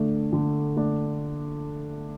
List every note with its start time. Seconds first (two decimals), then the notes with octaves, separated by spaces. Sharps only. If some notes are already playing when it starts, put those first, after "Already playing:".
Already playing: D3 A3 D4
0.32 D3
0.77 A3 D4